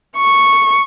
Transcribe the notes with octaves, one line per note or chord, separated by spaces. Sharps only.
C#6